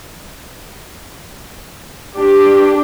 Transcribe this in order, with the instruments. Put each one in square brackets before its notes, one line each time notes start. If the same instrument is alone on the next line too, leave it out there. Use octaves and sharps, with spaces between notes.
[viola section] D4 G4